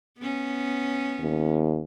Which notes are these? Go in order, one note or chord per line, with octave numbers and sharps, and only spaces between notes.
B3 C#4
D#2